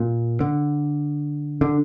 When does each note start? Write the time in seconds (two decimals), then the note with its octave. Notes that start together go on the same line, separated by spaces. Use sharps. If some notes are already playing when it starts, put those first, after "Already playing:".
Already playing: A#2
0.40 D3
1.61 D3